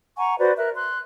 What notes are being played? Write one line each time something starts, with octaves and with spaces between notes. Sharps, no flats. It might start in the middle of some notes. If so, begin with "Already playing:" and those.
F#5 G#5 A#5 C#6
F#4 B4 C5 D5
A#4 E5 F#6
C6 F#6